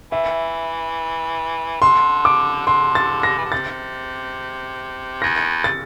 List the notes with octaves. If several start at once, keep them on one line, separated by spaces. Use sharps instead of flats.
E3 E5
D3 C6
D6
D3 C6
A6
A#6
E3
D3
C3 A6
E2 A#6
A6